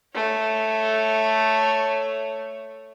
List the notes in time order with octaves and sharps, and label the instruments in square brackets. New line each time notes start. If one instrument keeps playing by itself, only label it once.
[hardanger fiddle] A3 C#5